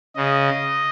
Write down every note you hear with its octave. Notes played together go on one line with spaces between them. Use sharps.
C#3 D#5